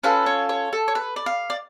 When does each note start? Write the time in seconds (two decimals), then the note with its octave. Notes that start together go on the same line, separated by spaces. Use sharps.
0.04 C#4 F4 A4 B4
0.26 C#5
0.49 C#5
0.73 A4
0.88 C#5
0.95 B4
1.16 D5
1.26 F5
1.50 D5